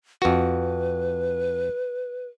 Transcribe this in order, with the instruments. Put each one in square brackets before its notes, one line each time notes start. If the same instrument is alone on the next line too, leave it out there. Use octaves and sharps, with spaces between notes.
[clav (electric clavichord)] F2 F#4 [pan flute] B4